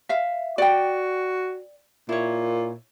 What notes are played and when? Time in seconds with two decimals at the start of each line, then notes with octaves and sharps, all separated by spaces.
0.09 E5 F5
0.58 F#4 D5 G5
2.09 A#2 E4 C#5